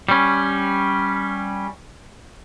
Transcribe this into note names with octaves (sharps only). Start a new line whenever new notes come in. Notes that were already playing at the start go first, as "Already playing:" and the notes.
G3 C#4